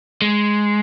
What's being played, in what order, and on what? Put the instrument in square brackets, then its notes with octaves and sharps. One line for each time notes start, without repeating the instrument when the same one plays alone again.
[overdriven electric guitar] G#3